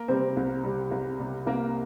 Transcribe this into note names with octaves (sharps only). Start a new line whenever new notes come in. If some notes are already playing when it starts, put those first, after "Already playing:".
Already playing: A#3 A#4
C3 G3 C4 C5
C2
C3 G3
C2
C3 G3
C2 A#3 A#4